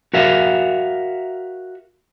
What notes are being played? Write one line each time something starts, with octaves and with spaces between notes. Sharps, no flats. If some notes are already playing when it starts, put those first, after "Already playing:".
F#4 A#4 E5 F5